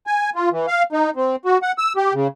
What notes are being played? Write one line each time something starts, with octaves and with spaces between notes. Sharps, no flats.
G#5
F4
E3
F5
D#4
C4
F#4
F#5
E6
G4
C#3